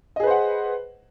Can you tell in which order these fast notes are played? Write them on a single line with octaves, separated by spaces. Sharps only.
D#5 G#4 B4 C5 F#5